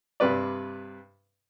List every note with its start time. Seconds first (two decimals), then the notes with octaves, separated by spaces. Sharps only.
0.20 G2 C3 B4 D5